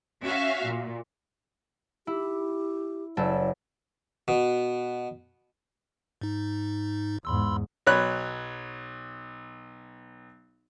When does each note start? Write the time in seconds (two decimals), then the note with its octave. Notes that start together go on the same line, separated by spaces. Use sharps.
0.23 C#4 F#4 E5 F5
0.66 A#2
2.07 E4 G4
3.17 F#1 A4 D5
4.28 B2
6.21 G#2 D#4
7.25 E2 G#2 B5 C6 E6
7.87 B1 C#5 B5 F#6